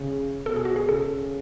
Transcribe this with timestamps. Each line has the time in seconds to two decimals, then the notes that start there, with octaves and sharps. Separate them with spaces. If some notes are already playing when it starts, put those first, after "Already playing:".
Already playing: C#3
0.45 B2 A4
0.56 G#4
0.65 F#4
0.76 G#4
0.88 C#3 A4